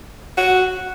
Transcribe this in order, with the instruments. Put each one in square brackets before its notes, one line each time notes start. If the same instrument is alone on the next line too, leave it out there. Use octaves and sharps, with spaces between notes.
[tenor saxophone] F#4